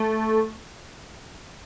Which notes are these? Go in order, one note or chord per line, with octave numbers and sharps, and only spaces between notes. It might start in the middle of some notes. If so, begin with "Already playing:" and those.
Already playing: A3